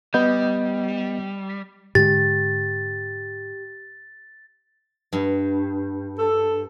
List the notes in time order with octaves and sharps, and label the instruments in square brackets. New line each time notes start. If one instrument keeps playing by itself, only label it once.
[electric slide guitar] G3 [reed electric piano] B3 D#5 G6
[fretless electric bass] G#2 D3 G#3 [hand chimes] G4 [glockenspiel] A6
[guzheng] G2
[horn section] A4